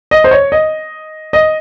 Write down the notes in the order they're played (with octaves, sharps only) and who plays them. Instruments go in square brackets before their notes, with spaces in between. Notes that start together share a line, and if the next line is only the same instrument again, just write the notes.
[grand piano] D#5
C5
C#5
D#5
D#5